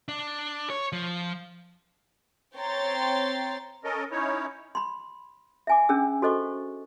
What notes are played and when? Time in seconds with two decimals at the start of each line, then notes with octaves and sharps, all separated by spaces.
0.08 D4
0.70 C#5
0.92 F3
2.56 C4 C#5 G5 A#5 C6 A6
3.84 C#4 A4 A#4 D#5
4.11 C#4 D#4 E4 C#5
4.75 B5 C6
5.67 E5 G#5 D6
5.89 C#4 D4 G#4 E6
6.22 F#4 A4 C5 D#5 C#6 D6